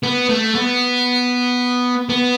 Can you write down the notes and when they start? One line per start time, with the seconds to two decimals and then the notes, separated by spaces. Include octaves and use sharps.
0.03 B3
0.29 A3
0.55 B3
2.10 B3